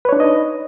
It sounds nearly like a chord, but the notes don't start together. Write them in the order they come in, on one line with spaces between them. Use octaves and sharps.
B4 C#5 D4 D#4 D#5